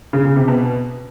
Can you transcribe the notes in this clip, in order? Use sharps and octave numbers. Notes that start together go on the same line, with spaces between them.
C#3
C#3
C3
B2